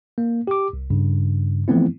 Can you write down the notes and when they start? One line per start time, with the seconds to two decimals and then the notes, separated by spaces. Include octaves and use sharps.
0.18 A#3
0.47 G4 D6
0.73 C2
0.90 G2 C#3
1.68 E3 F3 A3 B3 C4 E4